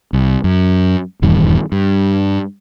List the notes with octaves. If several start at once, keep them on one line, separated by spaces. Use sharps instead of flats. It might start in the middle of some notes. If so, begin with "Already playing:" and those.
C2
F#2
D#1 E2 G2 D#3
G2